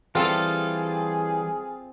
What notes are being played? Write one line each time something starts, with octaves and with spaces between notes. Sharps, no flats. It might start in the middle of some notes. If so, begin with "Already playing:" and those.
E3 G3 C4 F4 G#4 A4 D#6